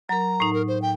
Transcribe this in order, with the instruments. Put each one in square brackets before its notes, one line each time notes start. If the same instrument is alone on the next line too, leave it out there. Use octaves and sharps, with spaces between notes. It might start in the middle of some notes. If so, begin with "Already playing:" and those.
[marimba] F#3 A#4 [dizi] A#5
[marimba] A2 D#4
[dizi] A#4
C5
G5